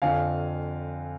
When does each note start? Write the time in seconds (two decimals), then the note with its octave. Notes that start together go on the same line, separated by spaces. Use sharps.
0.02 F2 D3 F3 F5 G#5